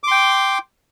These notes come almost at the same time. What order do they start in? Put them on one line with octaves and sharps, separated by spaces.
D6 C6 G5